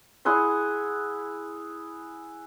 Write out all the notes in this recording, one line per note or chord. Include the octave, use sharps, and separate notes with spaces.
E4 G#4 F#5 C6